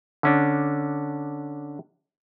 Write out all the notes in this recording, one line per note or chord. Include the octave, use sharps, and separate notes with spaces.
D3 C#4 D4